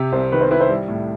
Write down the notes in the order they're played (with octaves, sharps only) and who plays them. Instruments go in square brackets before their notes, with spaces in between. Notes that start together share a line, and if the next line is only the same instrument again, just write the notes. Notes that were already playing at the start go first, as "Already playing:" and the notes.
Already playing: [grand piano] C3 G4
[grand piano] C2 [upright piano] C5
[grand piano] D#3 [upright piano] B4
[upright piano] C5
[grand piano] E4 [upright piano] B4
[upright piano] C5
[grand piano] G3
A2